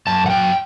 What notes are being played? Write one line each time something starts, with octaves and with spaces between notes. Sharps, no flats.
F#2 A5
F#5
F#3 G5